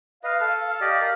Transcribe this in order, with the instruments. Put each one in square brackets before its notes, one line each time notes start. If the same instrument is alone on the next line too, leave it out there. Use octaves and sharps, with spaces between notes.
[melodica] B4 D#5 [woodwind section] F5
[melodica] A4 A5
[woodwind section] F5
[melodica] G4 D5 D#5
G4 A#4